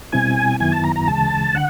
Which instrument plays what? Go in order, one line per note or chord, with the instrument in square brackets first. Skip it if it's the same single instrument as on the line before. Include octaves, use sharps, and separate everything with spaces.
[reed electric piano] B2 G3 C4 E4 [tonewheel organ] G#5
[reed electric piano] F#2 D#3 F#3 B3 E4 [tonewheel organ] G#5
[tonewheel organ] A5
A#5
A#5
[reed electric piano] D2 C#3 E3 G#3 [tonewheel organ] A5
[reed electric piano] D3 [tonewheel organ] F#5